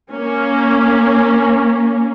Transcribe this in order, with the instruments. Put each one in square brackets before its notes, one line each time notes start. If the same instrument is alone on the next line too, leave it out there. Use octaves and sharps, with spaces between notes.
[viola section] A#3 C#4